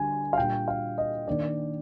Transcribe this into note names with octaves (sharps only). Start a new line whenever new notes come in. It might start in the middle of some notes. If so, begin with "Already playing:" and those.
Already playing: D3 G3 D4 G#5
F5
A#2 G3 D4 G5
F5
D#5
D#3 A#3 D4 D5